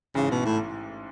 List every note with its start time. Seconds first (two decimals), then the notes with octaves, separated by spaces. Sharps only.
0.15 A1 G#2 C#3 E3
0.31 B2
0.45 A2